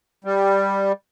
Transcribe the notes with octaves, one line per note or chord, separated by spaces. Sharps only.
G3